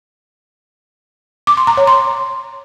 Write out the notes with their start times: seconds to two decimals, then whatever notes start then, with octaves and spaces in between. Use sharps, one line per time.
1.47 D6
1.57 C6
1.67 A#5
1.77 C#5
1.87 C6